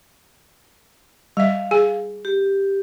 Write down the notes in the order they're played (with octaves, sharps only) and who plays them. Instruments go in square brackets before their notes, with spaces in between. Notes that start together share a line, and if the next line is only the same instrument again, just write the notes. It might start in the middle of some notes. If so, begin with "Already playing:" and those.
[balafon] G3 E5 [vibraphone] F5
[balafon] G#4 G#5
[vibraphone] G4